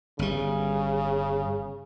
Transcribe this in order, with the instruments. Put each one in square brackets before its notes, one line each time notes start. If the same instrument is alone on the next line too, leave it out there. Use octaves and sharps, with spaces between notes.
[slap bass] G1 G3 [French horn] C#3